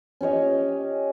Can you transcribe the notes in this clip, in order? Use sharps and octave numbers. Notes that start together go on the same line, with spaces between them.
C#4 G4 C#5 D#5